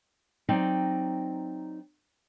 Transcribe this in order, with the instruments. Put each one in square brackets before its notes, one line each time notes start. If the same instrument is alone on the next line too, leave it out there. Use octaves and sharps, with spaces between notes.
[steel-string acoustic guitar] F#3 C4 D#4 D5 G5